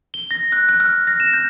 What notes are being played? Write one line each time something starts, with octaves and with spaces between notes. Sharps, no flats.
G7
A#6
F#6
F#6
F6
A#6
E7
G6